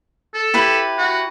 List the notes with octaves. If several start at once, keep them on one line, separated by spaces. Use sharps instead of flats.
A4
E4 G4 B4
F#4